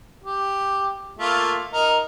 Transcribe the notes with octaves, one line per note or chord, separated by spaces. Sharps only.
G4
A3 A#3 F4
D#4 A#4 A#5